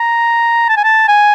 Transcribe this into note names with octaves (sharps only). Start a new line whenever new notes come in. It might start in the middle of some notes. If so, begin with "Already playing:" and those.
Already playing: A#5
A5
G#5
A5
G#5